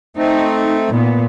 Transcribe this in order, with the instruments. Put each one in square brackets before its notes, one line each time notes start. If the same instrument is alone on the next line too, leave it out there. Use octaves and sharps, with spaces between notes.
[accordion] A3 C4 [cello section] D#4
[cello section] A#2 B3